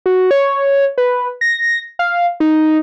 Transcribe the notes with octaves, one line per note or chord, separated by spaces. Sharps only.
F#4
C#5
B4
A#6
F5
D#4